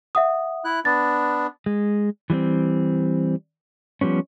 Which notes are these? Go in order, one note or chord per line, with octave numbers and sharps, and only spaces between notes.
E5 F#5 D#6
E4 F#6
B3 D4 A6
G#3
E3 G3 A#3 C4
F3 G3 B3 C#4